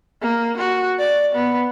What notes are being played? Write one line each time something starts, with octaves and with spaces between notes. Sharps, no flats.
A#3
F#4
D5
B3